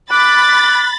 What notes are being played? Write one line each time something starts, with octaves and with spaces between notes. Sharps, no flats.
B5 D6 F#6 A6